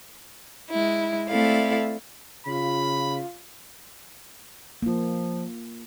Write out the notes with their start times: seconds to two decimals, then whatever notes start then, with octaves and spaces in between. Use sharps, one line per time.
0.72 G#3 E4
1.30 A3 C4 E4 A4 D5 F5
2.47 C#3 F4 B5
4.83 F3 A#3 F4